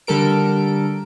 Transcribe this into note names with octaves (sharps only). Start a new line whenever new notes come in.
D3 G3 A4 A#4 D7